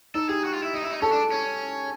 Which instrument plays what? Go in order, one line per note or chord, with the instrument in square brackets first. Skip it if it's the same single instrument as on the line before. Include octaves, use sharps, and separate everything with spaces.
[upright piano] D#4 [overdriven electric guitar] A4
[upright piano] G4 [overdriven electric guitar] G#4
[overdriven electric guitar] F#4
F4
E4
D#4
E4
D#4
[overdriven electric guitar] C#4 [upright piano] A4
[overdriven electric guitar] D4
C#4